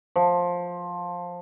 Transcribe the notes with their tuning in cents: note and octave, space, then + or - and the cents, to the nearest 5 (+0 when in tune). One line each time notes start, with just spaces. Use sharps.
F3 +15